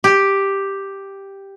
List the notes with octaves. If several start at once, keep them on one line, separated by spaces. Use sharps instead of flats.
G4